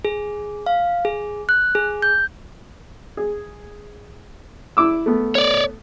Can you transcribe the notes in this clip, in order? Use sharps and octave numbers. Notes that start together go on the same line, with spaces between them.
G#4
F5
G#4
F#6
G#4
G6
G#4
E4 D6 E6
A3 B3
C#5 D5